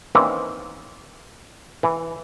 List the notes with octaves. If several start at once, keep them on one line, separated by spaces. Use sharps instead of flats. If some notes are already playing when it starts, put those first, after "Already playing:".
D#3 E3 A#3 C4 C#4 E4
E3